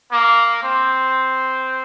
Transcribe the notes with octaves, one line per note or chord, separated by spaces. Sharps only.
A#3
C4